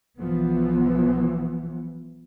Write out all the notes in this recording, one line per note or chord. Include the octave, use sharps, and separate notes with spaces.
B1 E3 F3 B3